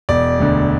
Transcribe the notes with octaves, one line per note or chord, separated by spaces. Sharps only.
E1 D5
D2 D3